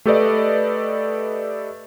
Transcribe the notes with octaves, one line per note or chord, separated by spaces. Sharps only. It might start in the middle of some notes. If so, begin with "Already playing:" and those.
A3 G4 A4 B4 D5 D#5